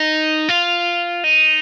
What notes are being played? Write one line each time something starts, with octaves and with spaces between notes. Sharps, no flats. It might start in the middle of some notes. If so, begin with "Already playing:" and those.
Already playing: D#4
F4
D#4